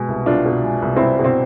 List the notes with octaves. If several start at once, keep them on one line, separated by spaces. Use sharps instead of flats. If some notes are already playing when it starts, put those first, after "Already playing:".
Already playing: B2 G#3
C2
C2 D4 F4
B2
G#3
C2
C4 E4
C2
B2
C4